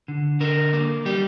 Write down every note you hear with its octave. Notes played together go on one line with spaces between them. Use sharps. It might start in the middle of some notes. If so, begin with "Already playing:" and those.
D3
D3 A#4
A#3
G3 G4